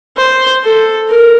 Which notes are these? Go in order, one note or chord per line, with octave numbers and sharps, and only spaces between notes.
C5
A4
A#4